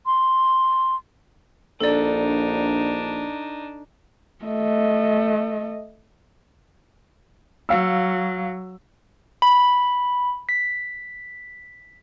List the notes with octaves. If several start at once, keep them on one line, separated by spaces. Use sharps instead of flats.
C6
A#1 D4 D#4 A4 D5
A3 D#5
F#3 F5 E6
B5
B6